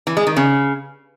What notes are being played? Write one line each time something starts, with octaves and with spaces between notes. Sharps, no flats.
E3
G#3
D#3
C#3